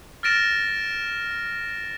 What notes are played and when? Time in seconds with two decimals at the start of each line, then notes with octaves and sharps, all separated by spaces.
0.23 F6 A6 A#6 D7 E7